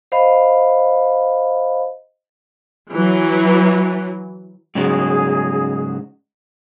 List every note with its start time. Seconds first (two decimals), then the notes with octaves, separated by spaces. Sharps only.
0.12 C5 D#5 F5 B5
2.91 E3 F#3
4.75 G#2 C#3 F#3 G#4